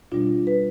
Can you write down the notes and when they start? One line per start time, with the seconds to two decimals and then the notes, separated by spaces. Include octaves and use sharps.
0.12 B2 G3 D4 F4
0.47 B4